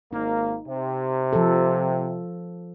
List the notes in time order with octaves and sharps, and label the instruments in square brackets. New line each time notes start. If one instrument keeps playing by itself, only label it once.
[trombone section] G#1 A#3 [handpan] D#4
[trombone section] C3
[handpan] F3 A4